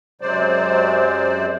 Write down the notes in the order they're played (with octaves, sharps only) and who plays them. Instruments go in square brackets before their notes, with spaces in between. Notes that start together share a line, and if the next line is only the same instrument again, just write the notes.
[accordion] F#2 C3 F#3 G#3 C5 D5